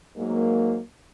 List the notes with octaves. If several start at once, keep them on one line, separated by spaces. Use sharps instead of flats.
G#2 F#3 A#3